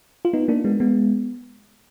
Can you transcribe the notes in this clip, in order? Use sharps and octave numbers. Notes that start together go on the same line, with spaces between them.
F4
B3 D#4
A#3 D4
G#3 B3
G#3 B3